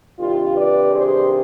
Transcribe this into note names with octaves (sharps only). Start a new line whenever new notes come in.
C3 D#3 G3 D4 F4
B4 D5
G#4 C5